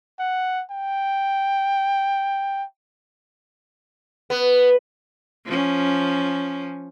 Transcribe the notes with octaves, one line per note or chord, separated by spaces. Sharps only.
F#5
G5
B3
F3 C#4